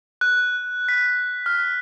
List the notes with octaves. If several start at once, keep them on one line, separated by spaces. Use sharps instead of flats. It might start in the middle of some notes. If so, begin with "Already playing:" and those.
F#6
B6
F6